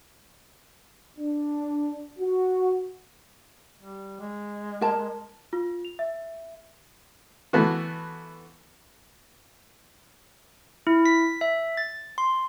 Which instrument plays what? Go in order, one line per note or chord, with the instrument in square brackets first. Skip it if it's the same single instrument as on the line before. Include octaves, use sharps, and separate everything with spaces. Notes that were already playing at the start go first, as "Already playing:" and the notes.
[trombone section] D4
F#4
[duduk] G3
G#3
[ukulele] A#4 A5
[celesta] F4
F7
E5
[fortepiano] E3 A3 B3 F#4
[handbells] E4
B6
E5
A6
C6